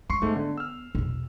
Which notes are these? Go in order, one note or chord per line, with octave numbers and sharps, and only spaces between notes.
G#3 C6 C#6 C7
G#2 A3 B3
D3
E6 F6
E2 B2